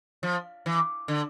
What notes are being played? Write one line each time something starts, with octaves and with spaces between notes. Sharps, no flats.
F3
E3
D3